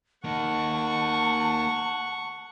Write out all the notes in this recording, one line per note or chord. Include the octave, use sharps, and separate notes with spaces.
A#3 D#4 F#5 A5 C#6